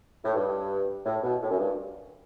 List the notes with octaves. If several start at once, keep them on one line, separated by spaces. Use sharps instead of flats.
A2
G2
A2
B2
A2
F#2
G2